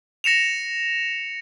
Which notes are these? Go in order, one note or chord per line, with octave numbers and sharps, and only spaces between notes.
A#6 C#7 E7 F7